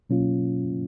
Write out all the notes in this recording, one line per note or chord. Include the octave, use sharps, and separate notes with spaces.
B2 F#3 A#3 C#4 F4